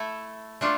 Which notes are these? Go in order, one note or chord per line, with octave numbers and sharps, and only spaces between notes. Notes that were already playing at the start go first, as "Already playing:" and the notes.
Already playing: A3 E4 A4
A3 D4 F4 A4